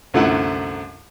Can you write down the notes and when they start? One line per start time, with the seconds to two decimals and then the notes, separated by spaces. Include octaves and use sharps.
0.14 C2 F#2 D3 A3 E4 F#5